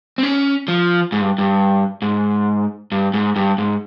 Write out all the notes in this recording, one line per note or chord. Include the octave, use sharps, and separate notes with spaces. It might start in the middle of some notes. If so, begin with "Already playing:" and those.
C4
C#4
F3
G#2
G2
G2
G#2
G2
G#2
G2
G#2